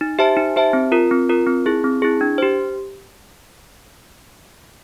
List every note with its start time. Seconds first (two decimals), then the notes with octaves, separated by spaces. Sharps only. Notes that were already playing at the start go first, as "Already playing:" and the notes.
0.01 D#4
0.19 G4 C5 E5 A5
0.37 D#4
0.56 G4 C5 E5 A5
0.73 C4
0.92 F4 A#4
1.11 C4
1.29 F4 A#4
1.46 C4
1.66 E4 G#4
1.84 C4
2.02 E4 G#4
2.21 D4
2.38 G4 C5